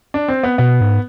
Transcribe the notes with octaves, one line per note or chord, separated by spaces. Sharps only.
D4
C4
B3
B2 B3
G#2